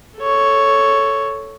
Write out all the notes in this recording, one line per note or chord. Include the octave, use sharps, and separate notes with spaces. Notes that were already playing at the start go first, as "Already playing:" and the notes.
A4 C#5